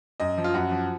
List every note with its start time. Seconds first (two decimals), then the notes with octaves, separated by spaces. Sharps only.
0.20 F#2 D#5
0.37 F3
0.44 F4
0.54 F#2 F#4
0.71 F3